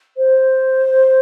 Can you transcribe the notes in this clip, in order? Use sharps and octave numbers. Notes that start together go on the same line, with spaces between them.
C5